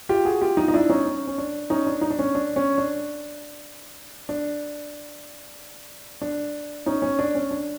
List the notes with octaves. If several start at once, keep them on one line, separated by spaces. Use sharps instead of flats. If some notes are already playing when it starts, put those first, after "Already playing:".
F4 G4
F#4 G#4
F4 G4
D#4 F4
D#4
D4 E4
C#4 D#4
C#4
C#4
D4
C#4 D#4
D4
D#4
D4
C#4
D4
C#4
D4
D4
D4
C#4 D#4
C#4
D4
C#4
D4